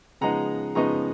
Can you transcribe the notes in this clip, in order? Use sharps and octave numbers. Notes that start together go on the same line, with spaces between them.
C#3 F3 G#3 B3 D#4 F#5 A#5
C#3 F3 G#3 B3 D#4 A#5 C#6